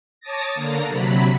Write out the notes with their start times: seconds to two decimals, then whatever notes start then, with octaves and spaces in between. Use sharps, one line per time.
0.20 C#5 A5 D6 D#6 A6 A#6
0.53 D3 A#3 A#5
0.87 C3 F#3 B5